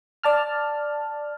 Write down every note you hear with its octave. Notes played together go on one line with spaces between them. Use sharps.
D5 A5 F6